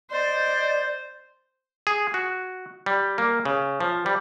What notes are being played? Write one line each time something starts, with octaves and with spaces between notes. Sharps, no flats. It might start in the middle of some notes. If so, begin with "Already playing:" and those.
C5 D5 D#5 G6
G#4
F#4
G3
A#3
C#3
F3
G3